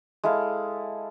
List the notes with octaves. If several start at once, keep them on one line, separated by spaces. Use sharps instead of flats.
G#3 E4 A4 F5